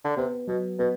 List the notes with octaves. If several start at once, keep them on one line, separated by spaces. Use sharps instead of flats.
D3
C3 B3
B2 F#3
B2 B3